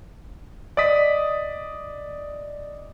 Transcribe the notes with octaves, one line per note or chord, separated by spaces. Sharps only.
D5 D#5 D#6 B6